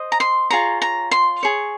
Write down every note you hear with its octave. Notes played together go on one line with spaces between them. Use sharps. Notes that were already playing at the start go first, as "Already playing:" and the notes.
Already playing: C5 D#5
A#5
C6
F4 G#4 C#5 A#5
A#5
C6
G#4 C#5